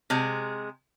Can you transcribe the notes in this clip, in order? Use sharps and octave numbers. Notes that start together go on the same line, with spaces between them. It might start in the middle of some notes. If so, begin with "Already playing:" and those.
C3 G#3